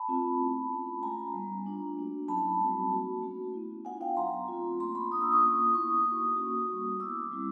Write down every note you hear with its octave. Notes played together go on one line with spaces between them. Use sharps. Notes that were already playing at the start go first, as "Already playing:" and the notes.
Already playing: A5 B5
A3 C4 F4
B3 E4
A3 C#4 F4
G#3 C#4 F4 G#5 A#5
G3 B3 D#4
A3 D4 F4
A#3 D4 F#4
F#3 A3 C#4 E4 A5 B5
G3 C4 D#4 F#4
A#3 D#4 F#4
A3 C#4 F#4
B3 E4
B3 D4 F4 F#5 G#5
F5 G5
F#3 B3 D#4 A#5 C6
A3 C4 F4
A#3 C#4 F4 A#5 C6
B5 C#6
A#3 D4 F4 D#6
E6
C#6 D#6
A#3 C#4 F4
B3 E4 C#6 D#6
A#3 D#4 F#4
A#3 C#4 F#4
G3 A#3 C#4 F#4
B3 E4 D6 E6
G3 C4 E4